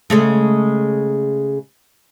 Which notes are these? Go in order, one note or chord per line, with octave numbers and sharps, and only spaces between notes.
C#3 G#3 A3